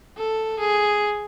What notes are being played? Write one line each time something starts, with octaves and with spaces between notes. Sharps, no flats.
A4
G#4